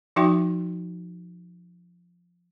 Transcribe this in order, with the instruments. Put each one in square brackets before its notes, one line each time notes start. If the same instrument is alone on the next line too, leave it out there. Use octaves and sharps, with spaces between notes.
[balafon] F3 D#4 F#4 E5 G5 C6